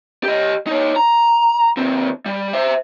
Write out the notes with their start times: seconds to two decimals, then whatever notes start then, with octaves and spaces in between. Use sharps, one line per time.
0.23 G4 D#5
0.67 D#4 C#5
0.96 A#5
1.77 D#2 C4
2.26 G3
2.53 C5 E5